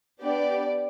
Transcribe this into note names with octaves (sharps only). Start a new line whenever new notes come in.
B3 D4 G4 D5